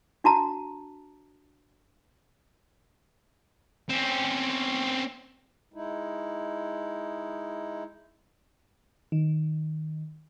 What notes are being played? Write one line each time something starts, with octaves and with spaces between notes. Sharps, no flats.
D4 F#4 A5 A#5
C4 C#4
G#3 D#4 E4
D#3